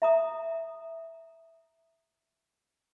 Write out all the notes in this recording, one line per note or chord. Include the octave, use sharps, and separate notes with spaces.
E5 A#5 D#6